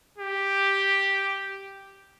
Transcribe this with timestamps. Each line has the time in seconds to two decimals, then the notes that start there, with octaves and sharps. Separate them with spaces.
0.18 G4